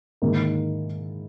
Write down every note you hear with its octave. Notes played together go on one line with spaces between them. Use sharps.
G#2 D#3 A#3 E4 A#4